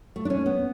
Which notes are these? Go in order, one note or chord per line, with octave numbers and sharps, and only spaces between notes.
A3
D4
C#4
B3